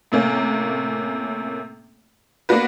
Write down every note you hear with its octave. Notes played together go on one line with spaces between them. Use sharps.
A2 C3 A#3 C#4
A#3 B3 D4 F#4 B4